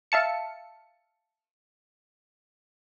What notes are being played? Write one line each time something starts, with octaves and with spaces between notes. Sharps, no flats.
E5 F5 A5 C#7